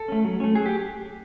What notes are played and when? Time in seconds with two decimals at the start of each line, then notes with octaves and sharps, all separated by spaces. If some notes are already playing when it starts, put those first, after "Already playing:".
Already playing: A4
0.08 A3 C#4
0.24 F#3
0.40 A3 C#4
0.55 F#3 G#4
0.66 G4